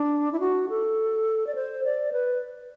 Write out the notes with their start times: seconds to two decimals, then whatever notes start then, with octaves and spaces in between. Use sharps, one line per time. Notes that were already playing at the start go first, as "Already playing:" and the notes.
Already playing: D4
0.32 E4
0.40 F#4
0.70 A4
1.47 D5
1.55 C5
1.84 D5
2.13 B4